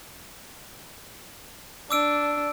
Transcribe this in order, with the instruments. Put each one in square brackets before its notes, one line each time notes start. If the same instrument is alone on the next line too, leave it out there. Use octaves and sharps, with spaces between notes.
[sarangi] D4 [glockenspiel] D6 E6 D7